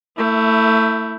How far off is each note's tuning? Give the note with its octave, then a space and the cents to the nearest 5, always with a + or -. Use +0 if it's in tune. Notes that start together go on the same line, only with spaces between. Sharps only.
A3 +25 E4 +0